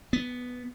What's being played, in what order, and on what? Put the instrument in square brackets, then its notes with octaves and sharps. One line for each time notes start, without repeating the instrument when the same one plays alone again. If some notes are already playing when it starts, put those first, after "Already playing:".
[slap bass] B3